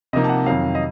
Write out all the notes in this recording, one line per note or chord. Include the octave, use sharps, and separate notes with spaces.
C3 F3 A#3 D#4 D#5
A5
F#5
F2 D#3 F#3 F5
D#5